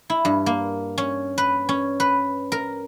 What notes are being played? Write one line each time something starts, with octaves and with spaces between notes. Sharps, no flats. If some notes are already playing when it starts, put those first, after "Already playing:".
E4
G2
A#3
C#4
B4
C#4
B4
A#4